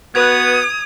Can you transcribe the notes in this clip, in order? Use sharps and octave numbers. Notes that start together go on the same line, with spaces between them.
B3 F#4 B4 D#6 G#6 F7